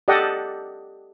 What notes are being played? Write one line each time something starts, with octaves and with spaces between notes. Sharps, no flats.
G4 A4 D5 D#5 F#5 G5